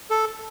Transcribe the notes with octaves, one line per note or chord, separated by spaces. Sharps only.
A4